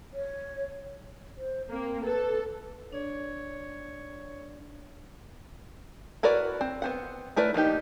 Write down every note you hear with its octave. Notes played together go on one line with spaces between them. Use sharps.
C#5
C5
A#3 C4
A4 B4
D4 C#5 D5
E4 F#4 A#4 B4 D5
C4
B3 C4 F#5
A3 E4 A#4 B4 D5
F3 A#3 D#4 G4